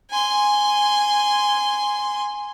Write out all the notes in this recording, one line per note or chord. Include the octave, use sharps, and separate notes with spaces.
G#5 C6